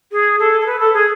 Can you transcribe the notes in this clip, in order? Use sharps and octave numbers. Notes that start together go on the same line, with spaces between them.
G#4
A4
A4
B4
A4
G#4